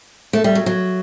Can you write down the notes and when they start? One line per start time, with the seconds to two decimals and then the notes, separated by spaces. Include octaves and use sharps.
0.33 A3
0.44 G3
0.55 F#3
0.66 F#3